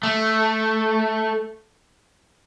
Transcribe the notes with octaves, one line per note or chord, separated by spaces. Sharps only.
A3